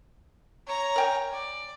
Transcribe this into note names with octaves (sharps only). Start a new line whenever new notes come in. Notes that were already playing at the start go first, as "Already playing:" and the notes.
C#5 A#5
A#4 G5 G#5
D5